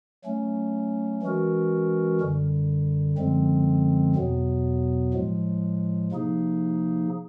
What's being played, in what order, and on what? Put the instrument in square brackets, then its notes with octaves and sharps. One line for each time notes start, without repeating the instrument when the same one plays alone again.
[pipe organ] F#3 A3 C#4
E3 G#3 C#4 F#4 A#4
F#2 D3 G3
F#2 D3 F3 G#3 C4
E2 B2 F#3 B3
A2 F3 G#3
C3 F3 A#3 D#4 G#4